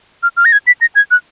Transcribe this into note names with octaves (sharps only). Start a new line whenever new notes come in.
F6
F6
A#6
G#6
B6
A#6
G#6
F#6